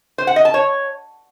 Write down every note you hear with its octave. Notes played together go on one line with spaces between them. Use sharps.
C5
F#5
D#5
A5
C#5